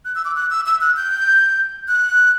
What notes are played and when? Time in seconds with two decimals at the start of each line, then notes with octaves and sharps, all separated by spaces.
0.05 F#6
0.15 E6
0.25 D6
0.36 F#6
0.50 E6
0.66 E6
0.81 F#6
0.96 G6
1.88 F#6